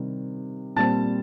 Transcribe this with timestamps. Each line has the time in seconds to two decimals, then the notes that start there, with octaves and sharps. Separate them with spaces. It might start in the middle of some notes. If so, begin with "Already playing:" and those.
Already playing: C3 D#3 G3
0.76 A#2 G3 C4 A5 A6